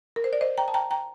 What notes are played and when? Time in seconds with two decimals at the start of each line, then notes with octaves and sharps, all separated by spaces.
0.16 A#4
0.24 C5
0.33 D5
0.41 C5 D#5
0.58 G5 A#5
0.68 A5
0.74 G5 A#5
0.91 G5 A#5